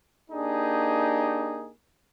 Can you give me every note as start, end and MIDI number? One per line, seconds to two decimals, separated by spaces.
0.31 1.70 58
0.31 1.70 62
0.31 1.70 63
0.31 1.70 67
0.31 1.70 68